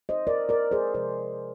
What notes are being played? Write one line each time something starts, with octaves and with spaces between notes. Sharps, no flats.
C5 D#5
A#4 D5
A#4 D5
G#4 C5
C3 F3 G#3 G#4 C5